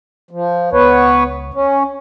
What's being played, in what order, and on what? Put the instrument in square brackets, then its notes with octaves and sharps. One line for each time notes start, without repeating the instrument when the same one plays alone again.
[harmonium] F3
[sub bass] C#2 [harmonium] B3 B4 C#5
[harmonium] C#4